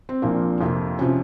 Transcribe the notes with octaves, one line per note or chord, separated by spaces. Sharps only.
C4
A#1 A#2 F3 A#3
F2 C3 F3 A#3
C3 F3 C#4